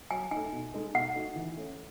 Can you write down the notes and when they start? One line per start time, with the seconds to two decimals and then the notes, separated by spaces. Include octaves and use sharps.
0.11 F#3 G#5
0.31 A3 D#4 G#5
0.52 B2
0.74 G#3 D#4 A4
0.94 B2 F#5
1.15 A3 D#4 F#4
1.36 E3
1.57 A3 C#4